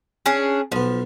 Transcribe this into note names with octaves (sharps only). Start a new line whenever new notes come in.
C#4 D4 G#4
B1 F3 B3